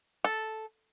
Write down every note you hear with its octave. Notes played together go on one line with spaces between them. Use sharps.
A4